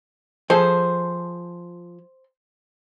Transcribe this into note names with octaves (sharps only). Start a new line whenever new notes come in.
F3 G#4 A4 C5